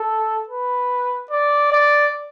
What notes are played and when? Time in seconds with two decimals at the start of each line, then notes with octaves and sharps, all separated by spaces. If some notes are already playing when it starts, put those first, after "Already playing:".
Already playing: A4
0.48 B4
1.31 D5
1.72 D5